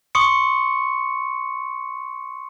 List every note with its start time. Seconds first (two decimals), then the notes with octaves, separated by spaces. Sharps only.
0.15 C6 C#6 D#6 C#7